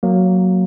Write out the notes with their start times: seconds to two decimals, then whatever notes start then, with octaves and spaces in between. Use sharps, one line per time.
0.03 F#3 A#3